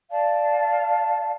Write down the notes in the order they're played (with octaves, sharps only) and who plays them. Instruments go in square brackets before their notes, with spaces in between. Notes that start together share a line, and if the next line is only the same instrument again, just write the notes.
[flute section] D5 F5 A5